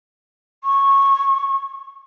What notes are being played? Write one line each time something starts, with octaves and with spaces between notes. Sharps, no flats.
C#6